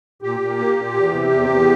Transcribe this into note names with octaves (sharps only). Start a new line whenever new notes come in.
A#2 G4
A#2
A#3
A#2
E2
C3
E2
E2